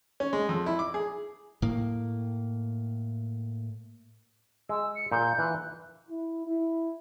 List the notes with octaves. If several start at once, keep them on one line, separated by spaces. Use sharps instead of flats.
C#4
G#3
F2
E4
D6
G#4
A2 A#3
G#3 E6
C#7
A#2 G6
E3 F4 F#6
E4
E4